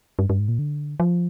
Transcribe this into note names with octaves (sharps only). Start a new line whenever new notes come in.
G2
G2
G#2
A#2
D3
F3